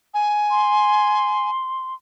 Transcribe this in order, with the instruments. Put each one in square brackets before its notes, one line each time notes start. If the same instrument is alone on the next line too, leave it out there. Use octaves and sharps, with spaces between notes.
[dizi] G#5
[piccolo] C6